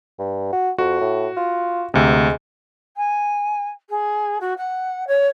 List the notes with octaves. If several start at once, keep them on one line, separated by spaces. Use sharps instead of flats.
G2
F#4
F2 F#4
A2
F4
D2 C3 G#3
G#5
G#4
F#4
F#5
C#5